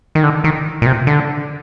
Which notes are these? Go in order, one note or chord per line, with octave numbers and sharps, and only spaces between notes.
D#3
D3
D#3
A#2
C3
D3